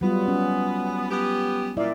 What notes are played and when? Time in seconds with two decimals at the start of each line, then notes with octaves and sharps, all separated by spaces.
0.01 F#3 G3 B3 F4
0.28 C#4
1.10 B3 G4
1.77 A#2 E4 D5 E5